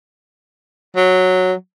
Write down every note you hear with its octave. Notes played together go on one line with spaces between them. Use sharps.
F#3